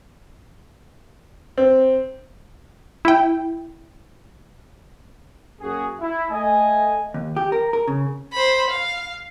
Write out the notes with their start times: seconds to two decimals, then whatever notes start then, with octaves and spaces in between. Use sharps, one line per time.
1.58 C4
3.05 E4 G5
5.61 F#2 A#3 C#4 F#4 G#4
6.00 E4
6.31 A3 D#5 G#5
7.14 D#2
7.36 G4
7.52 A#4
7.73 A#4
7.88 C#3
8.33 C5 B5
8.70 F5